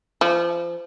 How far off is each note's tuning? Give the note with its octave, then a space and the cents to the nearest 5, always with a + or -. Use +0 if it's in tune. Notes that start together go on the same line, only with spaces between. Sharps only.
F3 -25